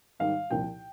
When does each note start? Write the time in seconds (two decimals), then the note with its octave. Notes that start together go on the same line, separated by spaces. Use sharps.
0.19 G#2 D#3 G3 F5
0.50 C2 A#2 F3 G5